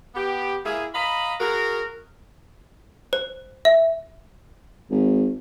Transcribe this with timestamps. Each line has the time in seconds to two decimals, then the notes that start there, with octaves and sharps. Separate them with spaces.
0.15 B3 G4
0.66 A#3 E4 G#4
0.95 D#5 F5 A#5 B5
1.40 F#4 G#4 A#4
3.13 C5
3.65 E5
4.91 G#1